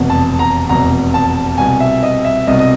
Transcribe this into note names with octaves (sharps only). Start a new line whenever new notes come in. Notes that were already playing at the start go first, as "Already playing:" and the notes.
Already playing: F1 E2 B2
A5
A#5
F1 E2 B2 A#5
A5
C2 B2 G#5
E5
D#5
E5
C2 B2 D#5
D#5